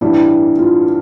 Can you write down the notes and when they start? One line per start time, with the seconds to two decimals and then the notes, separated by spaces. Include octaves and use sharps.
0.01 A1 G2 E3 G3 E4
0.59 F4